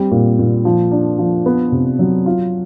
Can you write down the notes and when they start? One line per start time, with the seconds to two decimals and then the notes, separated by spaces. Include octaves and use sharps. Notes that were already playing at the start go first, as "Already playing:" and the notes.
Already playing: G3 C4
0.11 A#2
0.39 A#2
0.65 F3
0.91 D4
1.18 F3
1.46 B3
1.72 C3
1.99 F#3
2.26 F4